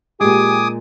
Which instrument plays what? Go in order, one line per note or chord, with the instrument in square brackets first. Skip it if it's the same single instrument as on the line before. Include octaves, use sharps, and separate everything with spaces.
[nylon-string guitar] A#2 G#3 [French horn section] G4 [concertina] G#5 D6 D#6